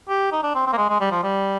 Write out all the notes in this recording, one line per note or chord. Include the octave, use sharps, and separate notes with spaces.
G4
D#4
D4
C4
C4
A#3
G#3
G#3
G3
F3
G3